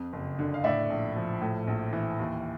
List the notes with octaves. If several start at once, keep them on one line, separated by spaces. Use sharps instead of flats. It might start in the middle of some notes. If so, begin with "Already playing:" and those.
Already playing: F2
F#1
D3
F5
A2 D5 E5
A#1
F3
A2
A#1
E3
D#2